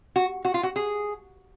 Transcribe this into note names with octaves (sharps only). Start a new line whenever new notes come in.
F#4
F#4
F4
F#4
G#4